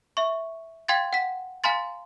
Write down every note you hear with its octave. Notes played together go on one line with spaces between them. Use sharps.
E5 C#6
F5 G5 C6 G#6 A6
F#5 B6
F5 G#5 A#5 C6 A6